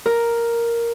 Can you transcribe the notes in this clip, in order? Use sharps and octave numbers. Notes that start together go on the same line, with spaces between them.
A#4